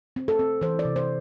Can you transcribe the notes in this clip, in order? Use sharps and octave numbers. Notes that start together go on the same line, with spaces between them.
C4
A4
C4
E3 C5
D5
C3
C5